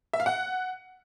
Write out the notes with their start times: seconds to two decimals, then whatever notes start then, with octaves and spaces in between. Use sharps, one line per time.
0.13 E5
0.20 F5
0.26 F#5